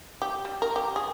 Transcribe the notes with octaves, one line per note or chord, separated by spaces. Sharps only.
G4
G3
A#4
G4
G#4